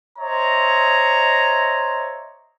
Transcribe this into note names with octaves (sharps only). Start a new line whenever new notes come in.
C5 C#5 D#5 E5 A#5